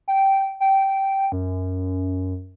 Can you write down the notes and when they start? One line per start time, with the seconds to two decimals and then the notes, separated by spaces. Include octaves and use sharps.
0.08 G5
0.60 G5
1.32 F#2